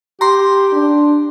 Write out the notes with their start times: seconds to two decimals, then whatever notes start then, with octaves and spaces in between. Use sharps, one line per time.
0.21 G4 A#5 C6
0.73 D4